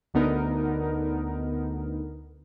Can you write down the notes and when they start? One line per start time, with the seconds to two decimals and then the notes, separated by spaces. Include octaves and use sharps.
0.14 D2 D3 B3 D#4 A#4